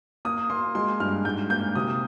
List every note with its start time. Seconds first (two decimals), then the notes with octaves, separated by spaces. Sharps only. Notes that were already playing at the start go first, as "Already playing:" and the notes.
0.25 A#3 D#6
0.50 A#3 C6
0.75 G#3 C6
1.00 G2 F6
1.25 G#2 G6
1.50 A#3 G6
1.75 C3 D#6